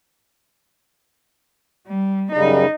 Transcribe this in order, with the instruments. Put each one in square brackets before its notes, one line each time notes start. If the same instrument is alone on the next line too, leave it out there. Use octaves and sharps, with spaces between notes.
[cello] G3
[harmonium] F#2 C#3 G3 [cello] D#4